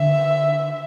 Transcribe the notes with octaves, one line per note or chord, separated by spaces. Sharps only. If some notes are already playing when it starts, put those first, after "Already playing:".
Already playing: D3 E5